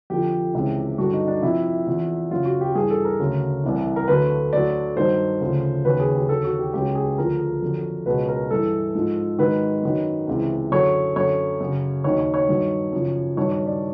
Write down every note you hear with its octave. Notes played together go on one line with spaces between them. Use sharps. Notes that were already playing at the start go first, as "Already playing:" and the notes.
F2 D3 F3 G4
C#2 C3 E3
G2 D3 F#3 F#4
D#4
D4
F2 C3 F3 E4
E2 C3 F3
F#2 C#3 F#3 F4
F#4
G4
G2 E3 G#4
A4
A#4
D2 C#3 F#3
C2 C3 E3
A#4
D2 D3 F#3 B4
D2 D3 F#3 D5
G2 D#3 F#3 C5
D2 C#3 F3
D#2 C#3 F#3 B4
G#4
G4
D#2 D3 F#3 A4
F#4
G4
C#2 C#3 F#3 G4
G#4
D2 D3 F3 A#4
F2 D3 F#3
C#2 B2 F#3 B4
A#4
G2 E3 A4
G#2 F3
G#2 D#3 F#3 B4
F#2 D#3 F#3
C#2 C3 E3
F#2 D3 F#3 C#5
F#2 D3 F#3 C#5
F#2 C#3 F#3
D#2 D#3 F#3 C#5
C#5
C#5
G2 D#3 F#3
F#2 C#3 F3
G2 D#3 F#3 C#5
C#5
D5